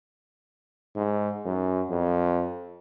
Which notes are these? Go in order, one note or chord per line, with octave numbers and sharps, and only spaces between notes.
G#2
F#2
F2